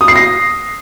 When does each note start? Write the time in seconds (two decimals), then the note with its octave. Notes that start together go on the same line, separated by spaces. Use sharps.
0.01 D#6
0.08 C7
0.16 A#6